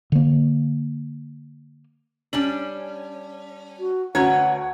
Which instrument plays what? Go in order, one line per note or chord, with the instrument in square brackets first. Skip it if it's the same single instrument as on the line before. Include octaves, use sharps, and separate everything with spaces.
[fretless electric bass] D3 A#3
[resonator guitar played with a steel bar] G3 C#4 D4 [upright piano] F#7
[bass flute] F#4
[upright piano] D2 A#5 G#6 [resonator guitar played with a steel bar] C#4 B4 C#5 [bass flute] F#5